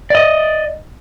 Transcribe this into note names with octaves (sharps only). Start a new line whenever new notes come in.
D5 D#5